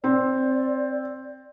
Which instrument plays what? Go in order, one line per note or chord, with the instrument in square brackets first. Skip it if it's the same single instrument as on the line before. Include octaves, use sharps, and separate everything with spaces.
[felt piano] C4 [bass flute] D5